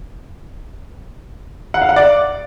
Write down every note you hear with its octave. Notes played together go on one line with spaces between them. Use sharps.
F#5
F5
F#5
D5